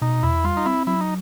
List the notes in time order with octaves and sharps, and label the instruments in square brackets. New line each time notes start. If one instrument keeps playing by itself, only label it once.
[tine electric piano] B2 [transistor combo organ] D#4
[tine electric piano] E2 [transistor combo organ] E4
[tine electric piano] G3 [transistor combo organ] F4
[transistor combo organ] D#4
[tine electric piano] C4 [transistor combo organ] E4
[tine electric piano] F#3 [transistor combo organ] E4
[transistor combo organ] D#4